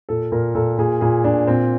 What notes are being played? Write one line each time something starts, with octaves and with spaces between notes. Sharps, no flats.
A#2 A4
A#2 A#4
A#2 A4
A#2 G#4
A#2 G#4
A#2 D4
A#2 C4